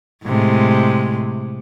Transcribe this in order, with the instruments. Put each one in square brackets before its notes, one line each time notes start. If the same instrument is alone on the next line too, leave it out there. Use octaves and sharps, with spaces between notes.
[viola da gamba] A2 C3 G#3